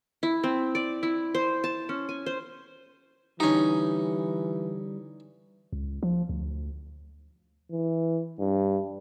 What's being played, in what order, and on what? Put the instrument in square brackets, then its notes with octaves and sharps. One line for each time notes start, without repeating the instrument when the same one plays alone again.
[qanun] E4
C4
D5
E4
C5
A5
C#4
G#5
C5
[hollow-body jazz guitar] D3 G3 G4 [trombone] E3 [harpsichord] C#4 D#4
[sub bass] C#2
F3
D2
[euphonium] E3
G2